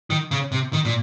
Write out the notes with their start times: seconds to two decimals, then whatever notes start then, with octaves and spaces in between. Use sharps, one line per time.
0.10 D#3
0.31 C#3
0.52 C3
0.73 D#3
0.85 A#2